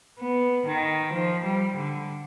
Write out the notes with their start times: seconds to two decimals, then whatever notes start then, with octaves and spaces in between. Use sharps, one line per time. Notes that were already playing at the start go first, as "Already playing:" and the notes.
0.19 B3
0.66 D#3
1.13 F3
1.45 G3
1.77 D3